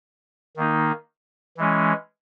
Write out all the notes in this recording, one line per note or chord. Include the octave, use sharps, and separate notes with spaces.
D#3 A#3 D#4
E3 G#3 C#4